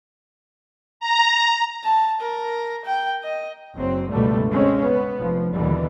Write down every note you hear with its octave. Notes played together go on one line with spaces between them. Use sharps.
A#5
A5
A#4
G5
D#5
F#1 F#3 C4
G1 C#2 B2 D3 G3 A3
C#3 G#3 C4 C#4
B3
F1 F3
D#2 B2 D3 E3 G3